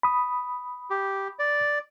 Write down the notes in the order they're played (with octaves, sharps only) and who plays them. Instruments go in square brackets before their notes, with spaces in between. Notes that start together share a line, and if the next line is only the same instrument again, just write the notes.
[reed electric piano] B5 D#6
[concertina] G4
D5